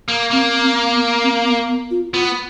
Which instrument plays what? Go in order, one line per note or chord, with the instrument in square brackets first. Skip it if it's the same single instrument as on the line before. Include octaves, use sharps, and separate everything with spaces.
[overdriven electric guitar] A#3
[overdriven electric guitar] A#3 [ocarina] C4
[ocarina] C4
B3
C4
B3
B3
F4
[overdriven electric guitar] B3 [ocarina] F4